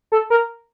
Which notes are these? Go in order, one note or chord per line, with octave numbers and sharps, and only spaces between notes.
A4
A#4